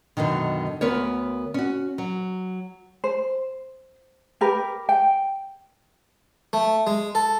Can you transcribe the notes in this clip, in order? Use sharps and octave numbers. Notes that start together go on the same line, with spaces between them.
F#2 B2 D3 D#3
D2 B3 A#4 C#5
C#4 F#4
F#3
C5
G4 A#4 B4
G5
A3
G#3
A4